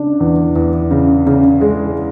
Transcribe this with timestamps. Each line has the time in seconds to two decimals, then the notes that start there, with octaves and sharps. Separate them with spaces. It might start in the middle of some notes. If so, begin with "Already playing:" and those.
Already playing: C#3 D4
0.20 E2
0.56 E2
0.91 C#3
1.27 C#3
1.61 G#3